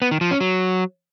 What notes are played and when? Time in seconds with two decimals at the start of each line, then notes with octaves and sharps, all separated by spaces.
0.02 B3
0.11 D#3
0.21 F3
0.31 C#4
0.41 F#3